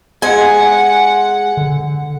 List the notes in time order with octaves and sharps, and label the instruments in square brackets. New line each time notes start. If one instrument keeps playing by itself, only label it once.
[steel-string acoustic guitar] G#3 G#5 [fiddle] F#5
[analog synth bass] D3